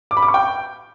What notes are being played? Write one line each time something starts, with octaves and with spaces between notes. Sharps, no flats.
D6
B5
D6
C#6
G5